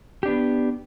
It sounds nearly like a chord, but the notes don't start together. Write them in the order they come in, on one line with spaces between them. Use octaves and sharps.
G4 D4 B3